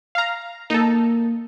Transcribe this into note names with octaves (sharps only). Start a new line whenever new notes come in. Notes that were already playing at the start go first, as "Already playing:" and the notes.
F5 A#5
A#3 D#4 A4